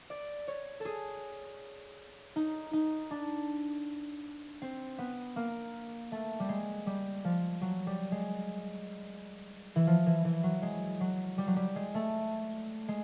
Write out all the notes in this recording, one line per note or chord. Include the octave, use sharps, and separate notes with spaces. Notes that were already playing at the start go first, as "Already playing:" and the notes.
D5
C#5
G#4 A4
D#4
D#4
D4
C4
B3
A#3
A3
G3
G#3
G3
F3
F#3
G3
G#3
E3
F3
E3
E3
F#3
G#3
F#3
G3
F#3
G3
G#3
A3
G#3